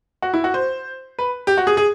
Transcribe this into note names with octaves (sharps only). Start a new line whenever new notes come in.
F#4
E4
F#4
C5
B4
G4
F#4
G#4
G#4